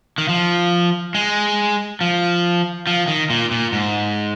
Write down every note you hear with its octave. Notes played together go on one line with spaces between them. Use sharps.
D#3
F3
G#3
F3
F3
D#3
A#2
A#2
G#2